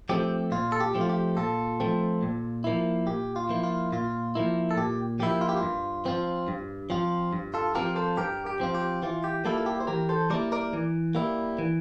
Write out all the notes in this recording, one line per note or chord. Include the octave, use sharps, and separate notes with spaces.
F3 A3 C4 G4
A#2 F4
A4
G4
F3 A3 C4
F4
G4
A#2 F4 A4
F3 A3 C4
A#2
F3 A#3 E4
A#2 G4
F4
F3 A#3 E4
F4
A#2 F4
F3 A#3 E4
A4
A#2 G4
F3 A#3 E4 G4
F4
G4
F4
G2
F3 C4 F4
G2
F3 C4 F4
G2
F4 A4
F3 C4 F4 G4 A#4
A4 C5
G2 G4 A#4
G4
F3 C4 F4
G4
E3 F4
G4
G3 A#3 E4 F4 A4
A4
G4
C5
E3 G4 A#4
A4 C5
G3 A#3 E4 A#4 D5
A#4 D5
E3
G3 A#3 E4
E3